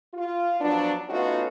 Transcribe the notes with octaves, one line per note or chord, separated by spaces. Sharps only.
F4
F3 F#3 B3 D4
A3 B3 C#4 D#4 F4 F#4